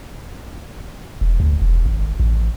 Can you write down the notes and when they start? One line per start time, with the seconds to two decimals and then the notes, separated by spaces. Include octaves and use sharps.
1.21 E1
1.40 D2
1.62 E1
1.86 G#1
2.20 A1